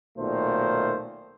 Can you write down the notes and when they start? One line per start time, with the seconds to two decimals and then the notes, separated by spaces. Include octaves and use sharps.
0.18 B1 A#2 D#3 A3 C5